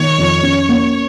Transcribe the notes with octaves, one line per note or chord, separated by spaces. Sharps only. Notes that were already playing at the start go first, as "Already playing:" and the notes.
Already playing: D#3 C#5
F2
C#4
A#3